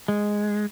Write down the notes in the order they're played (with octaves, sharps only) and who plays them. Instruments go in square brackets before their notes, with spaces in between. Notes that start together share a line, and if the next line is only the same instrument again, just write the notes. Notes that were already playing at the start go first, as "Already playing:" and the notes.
[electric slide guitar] G#3